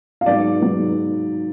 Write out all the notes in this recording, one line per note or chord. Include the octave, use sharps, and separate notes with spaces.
F5
G#2 F#3 B3 D5
G#2 F#3 B3